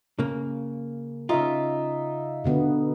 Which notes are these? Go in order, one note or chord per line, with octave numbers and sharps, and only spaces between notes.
C#3 A#3
C#3 D#4 F4 E5
B2 D3 B3